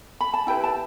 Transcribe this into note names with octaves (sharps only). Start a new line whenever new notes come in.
B5
A5
E4 G4 B4 G5
A5